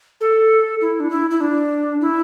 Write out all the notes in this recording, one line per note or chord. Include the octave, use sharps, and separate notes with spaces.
A4
E4
D4
E4
E4
D4
E4